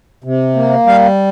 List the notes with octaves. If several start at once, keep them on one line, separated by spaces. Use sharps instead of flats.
C3
A#3
G3 F5